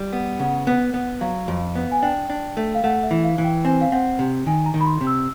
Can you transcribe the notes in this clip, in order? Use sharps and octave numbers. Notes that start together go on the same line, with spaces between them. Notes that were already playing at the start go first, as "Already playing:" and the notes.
Already playing: G3
B3
C#3 F#5
B3
B3
F#3 F5
F2
B3
G#5
D4 G5
D4
A3
F5
A3 F#5
E5
E3
F5
E3
G5
C4 G#5
F5
C4 F#5
C3
D#3 G#5
A#5
D#3
B5
C6
C3
E6